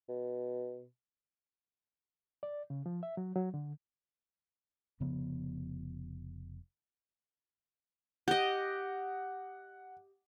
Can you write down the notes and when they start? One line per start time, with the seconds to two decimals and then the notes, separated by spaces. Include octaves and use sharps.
0.09 B2
2.43 D5
2.70 C#3
2.86 F3
3.03 E5
3.17 F#3
3.36 F#3
3.54 D3
5.00 F1 C#3 F3 B3
8.28 G4 D#5 F#5